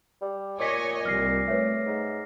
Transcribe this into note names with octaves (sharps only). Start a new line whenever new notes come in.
G3
A#2 C#5 D#5 G#5 D6 B6
C2 F6 A#6 C7
A3 B4 C#5 E5
G#2